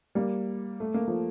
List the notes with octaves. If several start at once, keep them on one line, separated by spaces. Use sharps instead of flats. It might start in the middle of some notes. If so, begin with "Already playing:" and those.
G3 A#3
A3
A#3
F3 A3